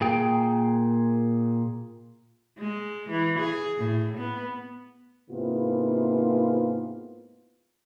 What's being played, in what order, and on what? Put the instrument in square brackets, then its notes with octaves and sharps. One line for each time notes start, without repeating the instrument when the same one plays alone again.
[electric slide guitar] A#2 G#4 G5
[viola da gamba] G#3
E3
G#4
A2
B3
[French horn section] G#2 C3 A#3 B3 E4 F4